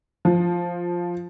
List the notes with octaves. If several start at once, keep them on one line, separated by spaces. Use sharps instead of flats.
F3